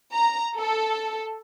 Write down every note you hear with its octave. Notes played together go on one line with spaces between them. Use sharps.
A#5
A4